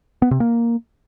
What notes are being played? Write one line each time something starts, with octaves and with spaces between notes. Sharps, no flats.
B3
C3
A#3